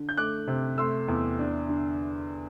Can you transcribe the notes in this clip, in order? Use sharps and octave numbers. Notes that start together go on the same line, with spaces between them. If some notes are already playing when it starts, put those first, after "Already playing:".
Already playing: D3
G6
A3 D6 F#6
C3
A3 C6 E6
E2
D4
D3